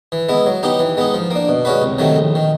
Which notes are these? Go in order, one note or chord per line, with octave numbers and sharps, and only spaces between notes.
E3
G#3 B3 E4
F#3
B3 D#4 G4
E3
G#3 B3 D#4
F3
A#3 D4
B2
G#3 C#4 F#4 B4
C2
C3 D#3 F#3 A3
A#1
D#3